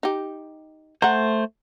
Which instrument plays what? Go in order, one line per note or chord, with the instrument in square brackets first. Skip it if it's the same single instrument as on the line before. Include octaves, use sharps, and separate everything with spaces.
[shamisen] D#4 G4
[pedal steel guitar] A3 C5 [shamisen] F#5 A#5